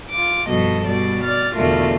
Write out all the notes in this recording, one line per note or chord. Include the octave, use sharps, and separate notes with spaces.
F4 D6
G2 B2 F3 A4 D#5
B2 G3 D5
D5 F6 A6
E2 B2 D3 A3 F4 A#4